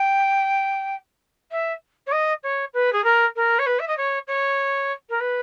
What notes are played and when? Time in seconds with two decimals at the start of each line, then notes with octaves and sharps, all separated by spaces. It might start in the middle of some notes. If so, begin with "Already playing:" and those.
Already playing: G5
1.51 E5
2.06 C#5
2.11 D#5
2.43 C#5
2.73 B4
2.92 G#4
3.04 A#4
3.35 A#4
3.58 C#5
3.66 B4
3.79 E5
3.87 D#5
3.97 C#5
4.27 C#5
5.09 A#4
5.20 B4